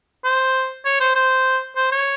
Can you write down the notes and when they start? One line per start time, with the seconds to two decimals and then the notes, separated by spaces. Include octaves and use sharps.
0.25 C5
0.85 C#5
1.00 C5
1.15 C5
1.76 C5
1.92 C#5